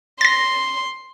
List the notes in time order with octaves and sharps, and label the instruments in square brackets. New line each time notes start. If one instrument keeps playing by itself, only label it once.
[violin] C6 [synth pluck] A6 A#6